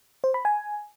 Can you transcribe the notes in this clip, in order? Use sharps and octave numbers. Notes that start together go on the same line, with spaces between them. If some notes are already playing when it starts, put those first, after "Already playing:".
C5
B5
G#5